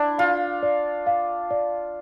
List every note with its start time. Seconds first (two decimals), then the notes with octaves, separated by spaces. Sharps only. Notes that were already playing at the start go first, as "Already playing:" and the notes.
Already playing: D4 E4 D5
0.18 F4 F5
0.63 D5
1.07 F5
1.51 D5